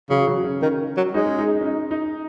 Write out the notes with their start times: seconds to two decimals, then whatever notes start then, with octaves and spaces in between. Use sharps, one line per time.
0.10 C#3 F#3
0.27 F#3
0.44 C#4
0.62 D#3 C#4
0.97 F#3
1.13 G#3 D#4
1.26 C#4
1.38 D#4
1.61 C#4
1.66 D#4
1.91 D#4